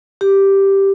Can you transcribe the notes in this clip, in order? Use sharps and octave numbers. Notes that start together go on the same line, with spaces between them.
G4